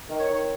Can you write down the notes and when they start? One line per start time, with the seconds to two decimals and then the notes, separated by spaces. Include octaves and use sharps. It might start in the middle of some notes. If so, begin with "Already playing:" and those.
0.09 D#3
0.18 C#5
0.28 D#3